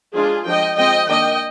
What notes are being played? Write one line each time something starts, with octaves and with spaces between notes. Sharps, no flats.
F3 G#3 D4 F4 G#4
F3 G#3 D4 D#5 G5
F3 G#3 C4 D#5 G5
D#3 A#3 D4 D#5 G5